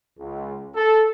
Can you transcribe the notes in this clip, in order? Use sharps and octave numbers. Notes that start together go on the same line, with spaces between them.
C#2
A4